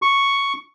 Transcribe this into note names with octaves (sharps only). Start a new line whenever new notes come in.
C#6